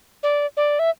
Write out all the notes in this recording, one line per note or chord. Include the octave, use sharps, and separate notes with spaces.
D5
D5
E5